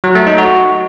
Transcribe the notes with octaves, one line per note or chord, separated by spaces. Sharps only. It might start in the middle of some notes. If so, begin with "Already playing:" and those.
F#3
A3
D#4
F#4